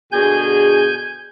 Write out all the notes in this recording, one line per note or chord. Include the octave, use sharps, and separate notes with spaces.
B2 D3 G#4 G#5 G6